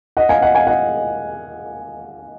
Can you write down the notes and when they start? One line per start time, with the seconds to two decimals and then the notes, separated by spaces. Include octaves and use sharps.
0.17 D#5 F#5
0.29 F5 G#5
0.42 D#5 F#5
0.55 F5 G#5
0.67 D#5 F#5